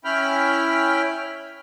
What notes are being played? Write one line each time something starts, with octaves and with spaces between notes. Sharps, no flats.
C#4 E4 G5 B5 F6